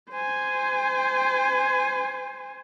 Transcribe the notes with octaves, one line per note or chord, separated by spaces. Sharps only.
C5 G#5